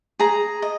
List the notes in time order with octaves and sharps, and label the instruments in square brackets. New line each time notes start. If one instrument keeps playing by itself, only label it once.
[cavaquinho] G#4 A#5
D#5